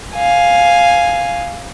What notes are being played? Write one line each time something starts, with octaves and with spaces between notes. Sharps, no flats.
F5 G#5